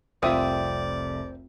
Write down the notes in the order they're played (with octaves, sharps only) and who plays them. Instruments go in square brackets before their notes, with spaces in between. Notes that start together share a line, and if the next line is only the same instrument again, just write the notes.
[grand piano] F1 C2 [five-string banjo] C4 [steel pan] F4 E5 D#6 [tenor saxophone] D5